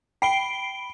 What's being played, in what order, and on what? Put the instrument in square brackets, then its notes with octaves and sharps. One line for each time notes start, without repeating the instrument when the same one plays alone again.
[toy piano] G5 [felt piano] B5 [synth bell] C7 D7 G7